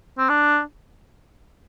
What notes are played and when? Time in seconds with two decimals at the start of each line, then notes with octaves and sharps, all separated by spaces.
0.18 C4
0.29 D4